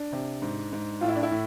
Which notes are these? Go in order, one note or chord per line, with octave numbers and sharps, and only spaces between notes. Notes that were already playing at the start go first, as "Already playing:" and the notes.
Already playing: D4
C3
G#2
G#2
A2 F4
E4
D4
E4
A2